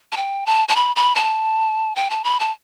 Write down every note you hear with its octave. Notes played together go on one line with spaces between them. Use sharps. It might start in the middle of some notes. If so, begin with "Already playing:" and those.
A5
G5
A5
A5
B5
B5
A5
G5
A5
B5
A5